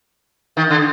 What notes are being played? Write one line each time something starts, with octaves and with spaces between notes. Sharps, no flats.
D#3
D3